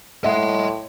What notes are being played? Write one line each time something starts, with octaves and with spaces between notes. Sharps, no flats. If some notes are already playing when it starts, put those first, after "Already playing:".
A2 D#5 E5 F#5 C6